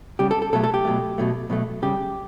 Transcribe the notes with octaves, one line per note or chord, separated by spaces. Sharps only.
C#3 G3 G4
A4
A4
B2 F#3 A3 A4
A4
G4
B2 F#3 A3
B2 F#3 A3
B2 F#3 A3
C#3 G3 G4